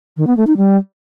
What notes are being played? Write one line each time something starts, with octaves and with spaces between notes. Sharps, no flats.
D#3
B3
A3
D#4
G3